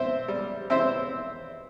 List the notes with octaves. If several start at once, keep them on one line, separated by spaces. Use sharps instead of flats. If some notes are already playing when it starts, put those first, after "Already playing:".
Already playing: C4 E4 C5 E5
G3
C4 E4 C5 E5